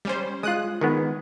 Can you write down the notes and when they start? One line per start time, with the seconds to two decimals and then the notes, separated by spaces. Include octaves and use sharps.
0.05 G3 C#4 C5
0.43 G#3 F4 D#6 F#6
0.81 D#3 G#3 B3